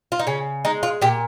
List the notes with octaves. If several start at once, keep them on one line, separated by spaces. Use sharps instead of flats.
F4
D#4
C#3 C#4
G#3 D#4
F4
A#2 G4